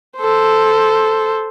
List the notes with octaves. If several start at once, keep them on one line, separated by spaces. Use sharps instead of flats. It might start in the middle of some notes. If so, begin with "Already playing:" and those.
A4 C5